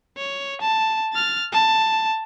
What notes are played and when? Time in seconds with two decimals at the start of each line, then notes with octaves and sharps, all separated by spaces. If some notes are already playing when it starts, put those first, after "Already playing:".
0.17 C#5
0.61 A5
1.13 F6 A6
1.52 A5